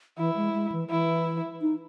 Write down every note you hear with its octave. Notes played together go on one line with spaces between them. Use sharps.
E3 E4
G#3
G#3
E3
E3 E4
D#4